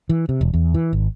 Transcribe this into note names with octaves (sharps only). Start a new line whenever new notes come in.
E3
C3
E1
E2
E3
G#1